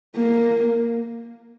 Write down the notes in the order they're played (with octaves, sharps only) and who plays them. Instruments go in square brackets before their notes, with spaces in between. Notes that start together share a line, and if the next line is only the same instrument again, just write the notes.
[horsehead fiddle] A#3